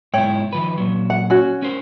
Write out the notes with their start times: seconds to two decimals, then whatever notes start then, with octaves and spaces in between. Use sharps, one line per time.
0.14 G#2 B2 E4 C#5 G5
0.53 D#3 F3 B4
0.78 A#2 F#3
1.10 F#5
1.30 C#4 F#4
1.62 C#4 A#4 C5